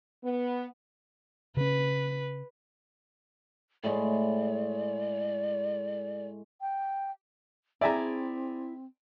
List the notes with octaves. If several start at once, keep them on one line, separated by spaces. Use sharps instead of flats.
B3
C#3 C#4 B4
A2 G#3 D5
G5
C4 E4 G#4 D5 E5 G5 G#5 A#5